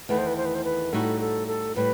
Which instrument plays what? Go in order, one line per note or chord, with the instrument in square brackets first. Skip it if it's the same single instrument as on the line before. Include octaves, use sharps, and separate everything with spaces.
[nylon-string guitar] E2 D#3 A3 [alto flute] B4
[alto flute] C5
B4
C5
B4
C5
B4
[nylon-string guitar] A2 G3 D#4 F#4 [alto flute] A4
[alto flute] A4
A4
[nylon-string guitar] A2 G3 [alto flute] B4